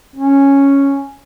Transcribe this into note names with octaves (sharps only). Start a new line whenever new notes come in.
C#4